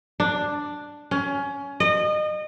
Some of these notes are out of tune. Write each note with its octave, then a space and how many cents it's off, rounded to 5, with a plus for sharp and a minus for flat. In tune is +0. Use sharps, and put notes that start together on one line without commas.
D4 +5
C#4 +20
D#5 -30